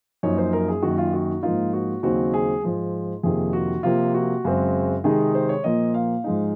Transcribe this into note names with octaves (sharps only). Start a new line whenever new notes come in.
F#2 F3 A#3 D#4 C#5
C5
A#4
G#4
F#2 D#3 A#3 D#4 F#4
F4
F#4
G#2 F3 A#3 D#4 F4
F#4
D#2 C#3 F#3 C4 D#4 F#4
G#4
G#2 F3 G#3
F2 C3 D#3 A#3 G#4
F#4
C3 F3 A#3 F4
F#4
F#2 C#3 G#3 C4
C3 D#3 G#3 D#4 G#4
C5
C#5
A#2 F3 A#3 D#5
F5
G#2 F3 G#3 D#4